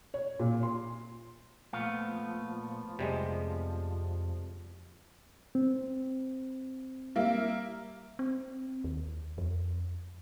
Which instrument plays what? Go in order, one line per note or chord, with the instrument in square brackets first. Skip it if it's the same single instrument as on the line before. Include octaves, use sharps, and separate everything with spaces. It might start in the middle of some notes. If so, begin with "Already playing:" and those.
[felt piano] C#5
A#2
C6
[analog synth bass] A#2 [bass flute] F3 [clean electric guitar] A3 B3 F5
[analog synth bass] F2 [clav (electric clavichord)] C3 G3 G#3
[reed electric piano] C4
[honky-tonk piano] G3 A#3 E5
[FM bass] C4
D#2
F2